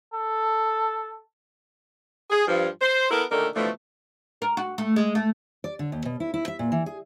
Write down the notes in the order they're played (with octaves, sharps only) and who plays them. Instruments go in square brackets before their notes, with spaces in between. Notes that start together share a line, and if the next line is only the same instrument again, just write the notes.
[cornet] A4
[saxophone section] G#4
G2 F3
C5
B3 E4 A4 A#4
A#2 D3 D#3 A3 A4 A#4
B2 D3 E3 F3 A3
[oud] A#4
F#4
A3
G#3
A3
[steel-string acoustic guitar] D5
D3
D#2
B2
E4
E4
E5
A#2
E3
G#4